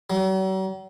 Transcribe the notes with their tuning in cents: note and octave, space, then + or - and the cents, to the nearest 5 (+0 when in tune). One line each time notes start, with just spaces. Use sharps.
F#3 +45